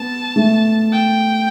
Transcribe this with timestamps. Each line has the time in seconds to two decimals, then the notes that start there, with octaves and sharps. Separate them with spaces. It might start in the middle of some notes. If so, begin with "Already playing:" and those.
Already playing: B3 A5
0.36 A3
0.93 G5